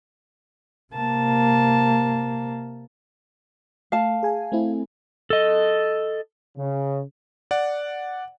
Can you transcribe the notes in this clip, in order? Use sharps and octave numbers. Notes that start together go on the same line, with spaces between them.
C3 A#3 A5
A3 F5 A5
G#4 G#5
A3 C4 E4
A4 D#5
C#3
D5 F#5